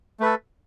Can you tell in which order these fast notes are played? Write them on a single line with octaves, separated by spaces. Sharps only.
A3 B4 A4